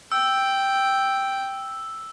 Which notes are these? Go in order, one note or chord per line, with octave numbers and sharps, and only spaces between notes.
G5 E6